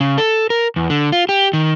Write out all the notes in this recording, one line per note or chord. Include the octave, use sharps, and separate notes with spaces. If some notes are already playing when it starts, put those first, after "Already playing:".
C#3
A4
A#4
E2
D3
F4
G4
D#3